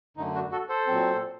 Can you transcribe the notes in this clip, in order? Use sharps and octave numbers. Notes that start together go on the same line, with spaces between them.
F#2 D3 A3 D#4
D4 F#4
F#4 A4
A4 C5
A#2 F#3 C4